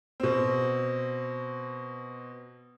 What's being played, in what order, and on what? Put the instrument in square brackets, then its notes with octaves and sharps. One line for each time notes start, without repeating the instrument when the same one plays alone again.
[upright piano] B2 C4